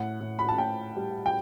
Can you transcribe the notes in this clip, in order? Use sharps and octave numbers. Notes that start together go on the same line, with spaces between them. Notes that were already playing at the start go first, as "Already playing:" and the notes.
Already playing: A2 F#5
A2
B5
A5
A2 G5
G3
G5